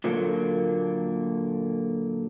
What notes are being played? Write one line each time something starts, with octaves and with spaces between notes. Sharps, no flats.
A#2 D3 F#3 A#3